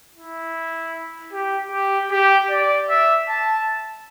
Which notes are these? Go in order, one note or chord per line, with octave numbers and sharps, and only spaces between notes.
E4
G4
G4
G4
D5
E5
A5